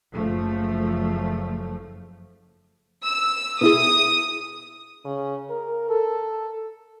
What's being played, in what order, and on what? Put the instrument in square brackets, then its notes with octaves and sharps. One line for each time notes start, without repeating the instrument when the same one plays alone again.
[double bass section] F#1 F3 A3
[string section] E6
[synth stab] B2 E4 G#4 [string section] D#6
[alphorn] C#3
A#4
A4